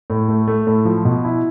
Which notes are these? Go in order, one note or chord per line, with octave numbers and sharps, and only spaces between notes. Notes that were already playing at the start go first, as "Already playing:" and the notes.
A2
A3
A3
A2
F3
B2
E4